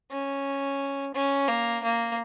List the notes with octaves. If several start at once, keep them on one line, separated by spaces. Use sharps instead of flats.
C#4
C#4
A#3
A#3